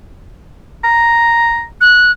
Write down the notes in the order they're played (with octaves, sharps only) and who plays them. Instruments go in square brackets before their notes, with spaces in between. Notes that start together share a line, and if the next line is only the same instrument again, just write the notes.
[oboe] A#5
[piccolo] F#6